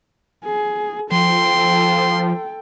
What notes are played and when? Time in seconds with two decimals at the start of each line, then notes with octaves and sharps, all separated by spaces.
0.45 G#4
1.12 F3 A4 G5 C6